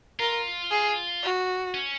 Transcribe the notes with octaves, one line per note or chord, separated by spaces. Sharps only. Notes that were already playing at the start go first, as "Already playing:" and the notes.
F4 A#4
G#4
F#4
C#4